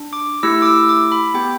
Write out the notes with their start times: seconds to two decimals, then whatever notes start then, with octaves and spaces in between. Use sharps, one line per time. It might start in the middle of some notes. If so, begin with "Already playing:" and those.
Already playing: D4
0.13 D6
0.43 A3 E4 G4 E6
0.62 D6
0.66 E6
0.89 D6
1.12 B5
1.34 B3 G4 G5